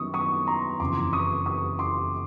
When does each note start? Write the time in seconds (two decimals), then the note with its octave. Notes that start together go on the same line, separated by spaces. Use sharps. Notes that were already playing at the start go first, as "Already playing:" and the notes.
Already playing: F#2 D#3 G3 B3 C#6 D#6
0.14 C#6 D#6
0.47 A#5 C6
0.80 F#1 F2 C#3 E3 C6 D6
1.13 C#6 D#6
1.46 C#6 D#6
1.79 C6 D6